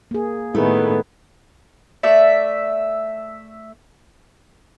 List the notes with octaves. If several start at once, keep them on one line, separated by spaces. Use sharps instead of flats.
A#3 G#4
A2 D#3 A3 B3 E4 G#4 B4
A3 D5 E5